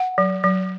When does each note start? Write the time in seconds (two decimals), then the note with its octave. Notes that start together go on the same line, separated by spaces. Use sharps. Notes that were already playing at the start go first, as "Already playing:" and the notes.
Already playing: F#5
0.18 F#3
0.44 F#3